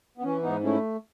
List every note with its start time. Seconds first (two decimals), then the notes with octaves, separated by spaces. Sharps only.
0.18 B3
0.23 E3 C#4
0.43 G#2 B3 D#4
0.64 A3 C#4 E4